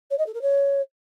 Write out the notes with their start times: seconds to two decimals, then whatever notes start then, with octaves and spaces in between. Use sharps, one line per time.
0.10 C#5
0.18 D#5
0.26 A4
0.34 A#4
0.42 C#5